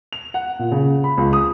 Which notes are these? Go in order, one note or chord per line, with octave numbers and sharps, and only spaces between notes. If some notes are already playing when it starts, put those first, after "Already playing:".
F7
F#5
A#2
C#3
B5
C#2
D#6